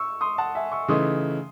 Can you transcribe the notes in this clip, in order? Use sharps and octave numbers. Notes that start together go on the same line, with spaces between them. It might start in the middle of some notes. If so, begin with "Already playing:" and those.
Already playing: C#6 E6
C6 D#6
F#5 A5
E5 G#5
C#6 E6
C#3 E3 A3 D#4 C6 D#6